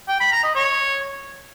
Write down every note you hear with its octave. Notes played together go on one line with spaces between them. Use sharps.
G5
B5
A#5
D#5
C#5